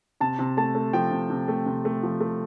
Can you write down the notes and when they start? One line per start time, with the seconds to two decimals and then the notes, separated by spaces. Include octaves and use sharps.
0.20 C3 A5
0.39 C3
0.57 A3 A5
0.75 A3
0.93 F3 G5
1.11 C3
1.30 C3
1.48 A3
1.66 C3
1.85 A3
2.03 F3
2.20 A3